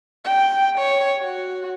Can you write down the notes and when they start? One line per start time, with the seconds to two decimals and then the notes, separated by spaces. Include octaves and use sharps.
0.25 G5
0.79 C#5
1.23 F#4